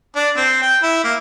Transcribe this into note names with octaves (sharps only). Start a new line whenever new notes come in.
D4
C4
G5
E4
A#3